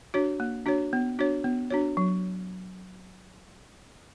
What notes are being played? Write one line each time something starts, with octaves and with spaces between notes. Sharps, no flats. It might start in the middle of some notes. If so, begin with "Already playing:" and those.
D4 F#4 C#5
A#3
D4 F#4 C#5
B3
D4 F#4 C#5
B3
D4 F#4 C#5
F#3